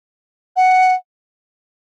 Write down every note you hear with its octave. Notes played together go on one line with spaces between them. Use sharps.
F#5